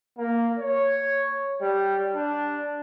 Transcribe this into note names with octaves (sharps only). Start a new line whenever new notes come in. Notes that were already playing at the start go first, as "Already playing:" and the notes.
A#3
C#5
G3
D4